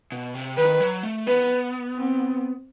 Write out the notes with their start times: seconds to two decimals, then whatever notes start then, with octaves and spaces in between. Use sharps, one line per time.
0.12 B2
0.34 C3
0.57 D#3 B4
0.80 F#3
1.03 A3
1.27 B3 B4
1.96 C4